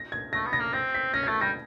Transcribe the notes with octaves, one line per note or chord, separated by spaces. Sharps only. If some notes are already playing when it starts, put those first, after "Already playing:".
Already playing: A#6
G#6
A3 A#6
B3
A#6
A#3
C4 A#6
B6
C#4 A#6
G#6
A3 A6
G3 A#6